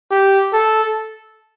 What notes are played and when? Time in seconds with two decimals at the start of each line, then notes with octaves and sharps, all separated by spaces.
0.11 G4
0.53 A4